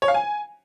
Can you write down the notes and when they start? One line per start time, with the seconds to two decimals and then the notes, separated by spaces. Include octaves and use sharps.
0.02 C#5
0.08 F5
0.14 G#5